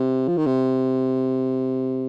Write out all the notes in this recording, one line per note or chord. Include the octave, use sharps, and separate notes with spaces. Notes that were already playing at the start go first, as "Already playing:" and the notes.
Already playing: C3
F3
D#3
C3